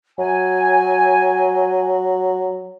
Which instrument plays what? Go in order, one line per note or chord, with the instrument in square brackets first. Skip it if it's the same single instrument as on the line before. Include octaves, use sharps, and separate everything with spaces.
[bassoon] F#3 [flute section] G#5